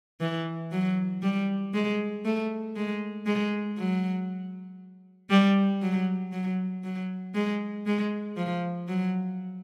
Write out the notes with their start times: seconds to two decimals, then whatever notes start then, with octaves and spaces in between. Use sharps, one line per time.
0.21 E3
0.71 F#3
1.23 G3
1.74 G#3
2.25 A3
2.76 G#3
3.26 G#3
3.78 F#3
5.30 G3
5.82 F#3
6.32 F#3
6.84 F#3
7.34 G#3
7.86 G#3
8.37 F3
8.88 F#3